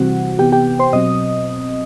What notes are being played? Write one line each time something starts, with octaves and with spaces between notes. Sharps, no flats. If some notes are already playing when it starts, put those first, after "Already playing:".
Already playing: C3 E3 G3 C4 F#4 F#5
C3 E3 B3 G4 G5
G4 G5
C5 C6
B2 F#3 C4 D#5 D#6